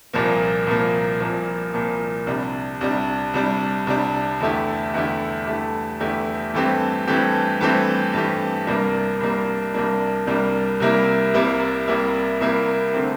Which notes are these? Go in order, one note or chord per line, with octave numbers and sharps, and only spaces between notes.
C2 A#2 F3 A#3
C2 A#2 F3 A#3
C2 A#2 F3 A#3
C2 A#2 F3 A#3
C2 C3 G3 D4
C2 C3 G3 D4
C2 C3 G3 D4
C2 C3 G3 D4
E2 D3 A3 E4 G4
E2 D3 A3 E4 G4
E2 D3 A3 E4 G4
E2 D3 A3 E4 G4
G2 E3 A3 C4 G4
G2 E3 A3 C4 G4
G2 E3 A3 C4 G4
G2 E3 A3 C4 G4
C2 C3 G3 A#3 D4
C2 C3 G3 A#3 D4
C2 C3 G3 A#3 D4
C2 C3 G3 A#3 D4
C2 C3 G3 A#3 E4
C2 C3 G3 A#3 E4
C2 C3 G3 A#3 E4
C2 C3 G3 A#3 E4
D3 A3 C4